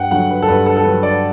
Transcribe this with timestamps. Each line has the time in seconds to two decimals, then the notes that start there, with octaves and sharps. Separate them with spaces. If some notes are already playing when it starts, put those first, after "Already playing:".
Already playing: G2 F#5 G5
0.11 D3 F#3 F#5
0.30 B4
0.42 A4
0.48 G2 B4
0.66 A4
0.77 A4
0.84 D3 F#3 B4
1.03 D5